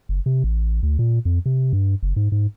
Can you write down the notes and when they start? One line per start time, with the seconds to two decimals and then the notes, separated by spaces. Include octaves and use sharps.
0.09 F#1
0.26 C3
0.44 A1
0.83 D2
0.99 A#2
1.25 F2
1.46 C3
1.73 G2
2.03 F#1
2.16 G#2
2.32 G#2